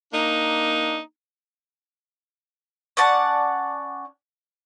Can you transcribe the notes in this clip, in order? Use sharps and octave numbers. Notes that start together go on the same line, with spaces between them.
A#3 D4 D#4
C#4 D5 F#5 A5